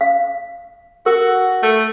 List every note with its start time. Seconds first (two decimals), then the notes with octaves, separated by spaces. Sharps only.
0.01 F5
1.06 F#4 A#4
1.63 A3